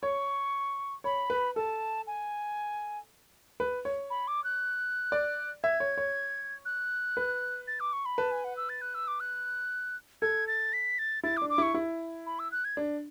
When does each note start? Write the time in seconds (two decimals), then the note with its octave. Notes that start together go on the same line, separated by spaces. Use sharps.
0.02 C#5 C#6
1.04 C#5 B5
1.30 B4
1.56 A4 A5
2.07 G#5
3.60 B4
3.85 C#5
4.10 B5
4.28 D6
4.44 F#6
5.12 D5
5.63 E5 G#6
5.80 C#5
5.98 C#5
6.65 F#6
7.17 B4
7.67 A6
7.80 D6
7.93 C#6
8.05 B5
8.18 B4 A5
8.31 G#5
8.44 F#5
8.57 E6
8.69 A6
8.81 F#6
8.95 E6
9.08 D6
9.20 F#6
10.22 A4 G#6
10.48 A6
10.73 B6
10.99 A6
11.23 E4 A6
11.37 D6
11.42 D4
11.50 D6
11.58 E4 C#6
11.74 E4
12.26 B5
12.39 E6
12.52 F#6
12.65 G#6
12.77 D4